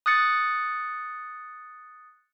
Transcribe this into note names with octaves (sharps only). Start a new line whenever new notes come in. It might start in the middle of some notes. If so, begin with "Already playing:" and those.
D#6 F#6 A6 C#7